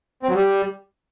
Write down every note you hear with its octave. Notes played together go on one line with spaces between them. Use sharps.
C4
F#3
G3